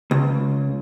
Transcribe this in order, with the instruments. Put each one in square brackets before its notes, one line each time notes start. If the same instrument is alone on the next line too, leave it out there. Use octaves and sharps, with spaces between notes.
[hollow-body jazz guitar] C#2